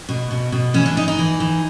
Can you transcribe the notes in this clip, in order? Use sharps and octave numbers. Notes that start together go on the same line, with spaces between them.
B2
B2
B2
E3 C#4
D4
E3 D#4
D#4
E3
E3